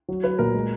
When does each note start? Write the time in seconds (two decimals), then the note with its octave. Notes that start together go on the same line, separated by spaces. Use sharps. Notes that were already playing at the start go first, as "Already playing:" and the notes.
0.09 F#3
0.24 F#3 B4
0.39 A#2 A#4
0.54 G#3